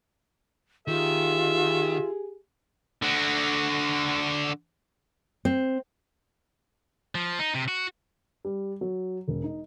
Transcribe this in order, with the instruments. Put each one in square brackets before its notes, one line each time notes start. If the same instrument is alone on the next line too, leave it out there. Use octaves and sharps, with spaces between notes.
[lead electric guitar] D#3 [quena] F4 [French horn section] G4 G#4 [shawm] E5
[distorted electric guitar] D3 F#4
[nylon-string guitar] C4
[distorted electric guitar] F3
D#4
C3
F#4
[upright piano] G3
F#3
E1
D#4